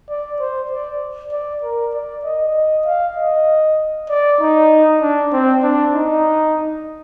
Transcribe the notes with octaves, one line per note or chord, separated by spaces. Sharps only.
D5
C5
D5
D5
A#4
D5
D#5
D#5
F5
D#5
D5
D#4
D4
C4
D4
D#4